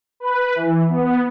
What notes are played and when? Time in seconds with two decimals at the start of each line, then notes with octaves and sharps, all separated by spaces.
0.20 B4
0.55 E3
0.89 B3